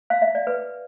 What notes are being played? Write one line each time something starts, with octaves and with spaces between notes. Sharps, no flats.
F5
E5
D5
B4